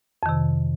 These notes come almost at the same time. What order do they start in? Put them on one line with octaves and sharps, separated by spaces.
F2 D#3 C3